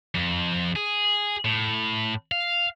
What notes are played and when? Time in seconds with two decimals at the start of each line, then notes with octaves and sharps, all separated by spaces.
0.14 F2
0.76 G#4
1.45 A2
2.32 F5